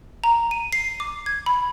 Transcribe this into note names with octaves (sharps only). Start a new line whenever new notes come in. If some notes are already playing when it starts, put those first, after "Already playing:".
A#5
D#7
C7
D6
G#6
B5